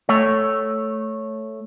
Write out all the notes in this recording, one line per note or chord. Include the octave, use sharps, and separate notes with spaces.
A3 C#5